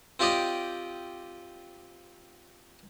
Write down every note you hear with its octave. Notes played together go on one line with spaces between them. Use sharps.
C4 F4 G4 D5 D#5